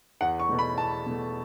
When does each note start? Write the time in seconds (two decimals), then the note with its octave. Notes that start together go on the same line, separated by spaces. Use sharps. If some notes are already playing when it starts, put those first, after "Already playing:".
0.21 E2 F#5
0.40 C#6
0.49 B2 A3
0.59 B5
0.77 E2 A5
1.06 B2 A3